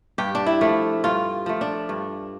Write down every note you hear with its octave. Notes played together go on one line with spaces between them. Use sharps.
G2 G4
D4
E4
F3 A3
G2 F4
F3 A3
D4
G2